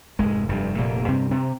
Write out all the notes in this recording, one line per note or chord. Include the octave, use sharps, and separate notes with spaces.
F1 G#2 G#3
F1 G2 G3
F1 A#2 A#3
G2 C3 C4
C3 C4